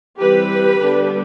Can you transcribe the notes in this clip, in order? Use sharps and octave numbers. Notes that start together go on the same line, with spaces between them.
E3 G3 C4 G4 B4
D3 G3 B3 D4